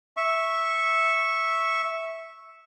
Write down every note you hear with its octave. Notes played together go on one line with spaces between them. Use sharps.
E5 C#6